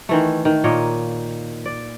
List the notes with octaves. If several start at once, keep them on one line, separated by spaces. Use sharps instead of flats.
D#3 E3 A3
D#3
A#2 A#3 C#5 D#5
D5